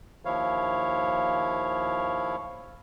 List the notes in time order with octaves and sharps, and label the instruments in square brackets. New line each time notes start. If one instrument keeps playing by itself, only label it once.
[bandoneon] D#2 F3 E4 C#5 F5